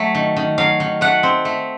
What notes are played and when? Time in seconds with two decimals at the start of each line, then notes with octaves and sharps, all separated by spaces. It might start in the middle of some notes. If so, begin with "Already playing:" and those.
Already playing: F#3 A3
0.15 D#3
0.36 D#3
0.58 F#3 F5
0.80 D#3
1.01 A3 F#5
1.23 C4
1.45 A3